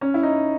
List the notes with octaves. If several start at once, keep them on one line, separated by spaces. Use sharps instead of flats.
C#4
E4
D#4